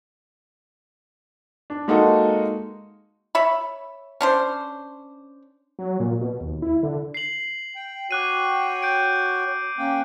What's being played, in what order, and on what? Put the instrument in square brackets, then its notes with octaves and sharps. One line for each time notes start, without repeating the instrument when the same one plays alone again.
[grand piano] D4
G#3 A#3 D#4 F#4 A4
[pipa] C#5 E5 B5
C#4 D4 C5
[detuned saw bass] F#3
A#2
B2
D#2
E4
D3
[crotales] C7 F#7
[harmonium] G5
[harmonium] F#4 C#5 G5 [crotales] D6 F#6 D#7
[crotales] G6 D7
[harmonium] A#3 C#4 G5